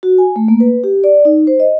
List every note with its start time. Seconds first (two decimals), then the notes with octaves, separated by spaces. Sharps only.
0.03 F#4
0.18 G#5
0.36 A3
0.48 A#3
0.60 B4
0.84 G4
1.04 D5
1.25 D#4
1.47 C5
1.60 D#5